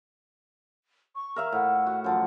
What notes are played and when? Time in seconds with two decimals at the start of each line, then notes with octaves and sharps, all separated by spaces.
1.15 C#6
1.36 A#4 E5 F5
1.52 A2 F#5
1.87 F#4
2.04 F#2 F3 F#5